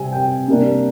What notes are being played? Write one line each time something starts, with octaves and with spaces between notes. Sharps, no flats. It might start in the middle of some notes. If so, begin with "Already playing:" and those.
Already playing: C3 G3 C4 G#5
G5
C3 G3 A#3 D4